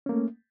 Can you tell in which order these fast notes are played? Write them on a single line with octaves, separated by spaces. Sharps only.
C#4 A#3 A3